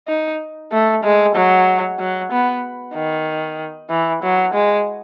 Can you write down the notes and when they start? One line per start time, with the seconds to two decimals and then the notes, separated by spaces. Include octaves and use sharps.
0.08 D#4
0.72 A3
1.03 G#3
1.35 F#3
1.99 F#3
2.32 B3
2.94 D#3
3.90 E3
4.23 F#3
4.54 G#3